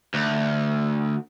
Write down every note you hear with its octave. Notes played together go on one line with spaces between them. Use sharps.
D2